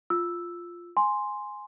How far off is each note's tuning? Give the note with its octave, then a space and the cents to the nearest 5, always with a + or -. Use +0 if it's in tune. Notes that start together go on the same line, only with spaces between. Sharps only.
F4 +0 E6 +0
G#5 +0 C6 +0